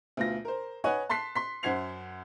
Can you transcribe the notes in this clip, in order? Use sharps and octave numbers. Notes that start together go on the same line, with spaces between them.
D2 B2 F4 A#6
A#4 C5
B4 C#5 D#5 F#5 G#5 F#6
A5 C6 F#6 B6 C7
C6 B6
F#2 C5 F#5 G#6 C7 F7